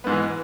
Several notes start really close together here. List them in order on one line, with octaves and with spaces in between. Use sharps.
B3 G#2 G#3 E3